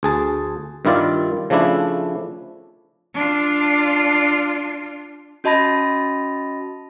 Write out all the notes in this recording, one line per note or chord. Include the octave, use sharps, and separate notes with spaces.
D2 G#4 A5
G2 D#3 E4 F4 D5
C#3 F3 A3 D4 E4
D4 F4
C#4 F#4 D#5 A5 B5 A#6